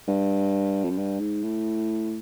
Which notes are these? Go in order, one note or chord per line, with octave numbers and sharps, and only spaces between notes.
G2
F2
F#2
G2
G#2
A2